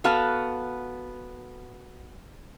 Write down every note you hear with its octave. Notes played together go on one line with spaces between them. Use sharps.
B3 F#4 A4 F5